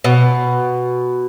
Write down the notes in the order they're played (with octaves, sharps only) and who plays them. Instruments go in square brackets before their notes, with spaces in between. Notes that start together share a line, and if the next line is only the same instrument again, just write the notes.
[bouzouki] B2